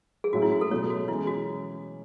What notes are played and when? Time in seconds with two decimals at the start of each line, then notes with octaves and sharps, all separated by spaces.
0.24 G#4
0.33 A2 F#3 C#4 F#4
0.42 E4
0.51 F#4
0.61 A4
0.70 B2 F#3 A3 C#5
0.90 F#4
1.08 E3 G#3 C#4 E4
1.27 F#4